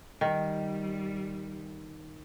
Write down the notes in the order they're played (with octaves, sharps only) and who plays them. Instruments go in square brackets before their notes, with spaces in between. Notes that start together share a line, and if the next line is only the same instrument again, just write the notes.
[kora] D#3 [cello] G3